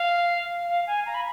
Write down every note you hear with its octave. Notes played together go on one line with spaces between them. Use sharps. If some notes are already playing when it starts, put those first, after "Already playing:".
Already playing: F5
F5
G#5
A#5
B5